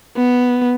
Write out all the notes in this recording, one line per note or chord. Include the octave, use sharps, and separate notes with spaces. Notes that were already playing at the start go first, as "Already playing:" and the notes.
B3